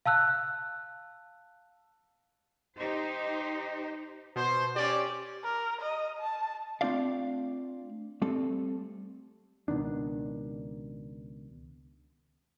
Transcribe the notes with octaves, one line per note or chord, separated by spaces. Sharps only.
F5 A5 E6 F#6
D#4 G4 C5
B2 C5
C#4 G4 D5
A#4
D#5
A5
A3 C4 D4 F4 D5 F5
G3 A3 C4 A4
C#2 B2 D#3 D4